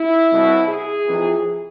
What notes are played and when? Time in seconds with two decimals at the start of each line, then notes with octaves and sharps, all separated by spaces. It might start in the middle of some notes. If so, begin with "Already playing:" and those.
Already playing: E4
0.31 C2 B2
0.68 G#4
1.06 F2 C3 E3